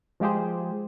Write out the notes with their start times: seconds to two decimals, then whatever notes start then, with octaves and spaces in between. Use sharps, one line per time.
0.20 F3 G#3 F4 G4 G#4 C5